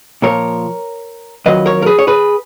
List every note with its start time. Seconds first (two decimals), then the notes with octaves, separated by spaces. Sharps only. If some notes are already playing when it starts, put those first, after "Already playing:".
0.22 A#2 F3 A#4 C#5
1.46 F2 D#3 F#3 B4 D#5
1.66 A#4 C#5
1.82 A#4
1.86 G#4 B4
1.99 C#5
2.07 G#4 B4